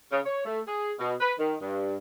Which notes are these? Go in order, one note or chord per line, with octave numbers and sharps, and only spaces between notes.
C#3
C#5
A3
G#4
B2
B4
D#3
G2